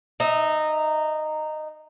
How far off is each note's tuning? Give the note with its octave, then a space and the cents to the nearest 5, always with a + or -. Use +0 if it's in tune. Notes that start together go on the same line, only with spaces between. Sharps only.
D#4 -15 E5 -35